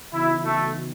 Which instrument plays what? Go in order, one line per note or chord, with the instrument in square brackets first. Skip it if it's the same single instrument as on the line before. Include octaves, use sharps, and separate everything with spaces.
[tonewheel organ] C#3 E3 B3 D#4 F#4 [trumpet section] E4
[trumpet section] A3